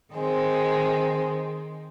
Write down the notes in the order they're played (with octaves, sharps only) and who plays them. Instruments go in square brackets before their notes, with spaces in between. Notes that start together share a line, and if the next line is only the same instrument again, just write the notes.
[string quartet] D#3 G#3 C4